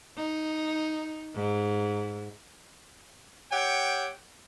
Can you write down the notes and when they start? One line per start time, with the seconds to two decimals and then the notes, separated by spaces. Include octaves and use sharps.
0.17 D#4
1.35 G#2
3.52 G4 C#5 E5 F#5 G5